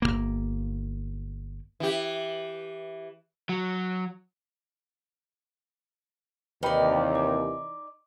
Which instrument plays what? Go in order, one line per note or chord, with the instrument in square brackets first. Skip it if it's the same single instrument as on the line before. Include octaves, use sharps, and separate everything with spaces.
[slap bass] G1 F#2 A#3
[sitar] E3 G4
[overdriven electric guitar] F#3
[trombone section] D#2 [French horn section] C3 E3 [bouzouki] D#4 D5 [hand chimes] B4 G5 B5
[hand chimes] D6